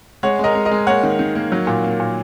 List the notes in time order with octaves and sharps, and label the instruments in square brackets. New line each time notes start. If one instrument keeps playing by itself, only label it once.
[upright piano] G#3 C#5 F#5
G#3 A#4 D#5
G#3
A#4 D#5
G#3
A#3 C#5 F#5
D#3
D#3
A#3
F#3
A#2
A#3
A#2